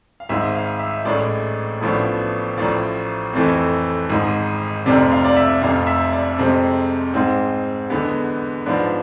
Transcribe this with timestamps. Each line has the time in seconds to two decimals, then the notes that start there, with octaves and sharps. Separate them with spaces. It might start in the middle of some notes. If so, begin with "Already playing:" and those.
0.20 F5
0.29 G#1 G#2 G#3 E5
0.55 F5
0.79 E5
1.05 A1 A2 G#3 D5
1.81 A1 A2 F3 B3 D4
2.57 A1 A2 F3 D5
3.33 F2 E3 A3 C4
4.10 G#1 G#2 G#3
4.86 F1 F2 C3 D5
5.11 F5
5.25 D5
5.36 E5
5.62 F1 F2 C3 F5
5.87 E5
6.12 D5
6.38 F2 C3 G#3 C4
7.14 G#2 G#3 C4
7.90 E2 D3 G#3 B3
8.66 G#2 F3 B3 D4 B4